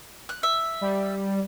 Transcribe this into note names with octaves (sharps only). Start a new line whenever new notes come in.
F#6
E5
G3